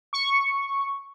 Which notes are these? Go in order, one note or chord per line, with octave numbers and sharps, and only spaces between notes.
C#6